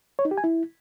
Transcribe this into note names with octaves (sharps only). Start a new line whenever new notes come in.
C#5
D#4
G4
G#5
E4